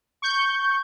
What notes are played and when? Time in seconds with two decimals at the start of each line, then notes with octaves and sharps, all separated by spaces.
0.22 C#6 G6